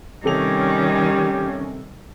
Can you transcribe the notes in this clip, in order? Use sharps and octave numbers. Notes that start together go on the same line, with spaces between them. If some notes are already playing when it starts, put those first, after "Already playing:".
C3 D#3 G3 C#4 G4 A4 F7